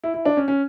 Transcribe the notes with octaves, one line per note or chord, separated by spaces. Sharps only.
E4
E4
D4
C#4
C#4